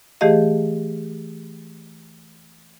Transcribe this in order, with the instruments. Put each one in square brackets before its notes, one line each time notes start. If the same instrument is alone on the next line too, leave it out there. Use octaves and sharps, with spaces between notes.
[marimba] E3 A3 G4 G#4 D#5 F5